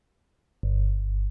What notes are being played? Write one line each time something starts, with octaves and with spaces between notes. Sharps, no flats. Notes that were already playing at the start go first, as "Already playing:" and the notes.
G1